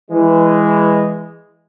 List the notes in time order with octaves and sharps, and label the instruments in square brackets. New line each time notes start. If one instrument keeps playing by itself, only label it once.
[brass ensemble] E3 G#3